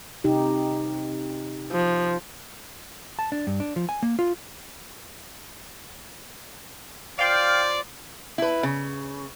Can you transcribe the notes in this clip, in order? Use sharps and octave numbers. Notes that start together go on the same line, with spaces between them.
C3 D#4 G4
F3
A5
D4
G2
D4
F3
G#5
A#3
F4
F4 C5 D5 F5 G5
E4 B4
C#3